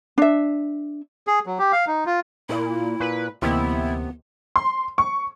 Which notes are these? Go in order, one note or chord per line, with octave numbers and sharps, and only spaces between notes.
D4 E5
G#4
F#3
G4
F5
D#4
F4
A#2 E4
A#2 B4
D2 C3 E3 A#3 B3 E4 G4 D#5
C6
C#6